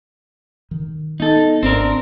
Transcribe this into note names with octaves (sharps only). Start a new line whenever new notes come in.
D#3
B3 D#4 A4
G#1 C4 D4 A#4